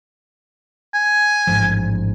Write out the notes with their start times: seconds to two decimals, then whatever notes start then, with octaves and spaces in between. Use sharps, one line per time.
0.94 G#5
1.47 A1 G#2 F3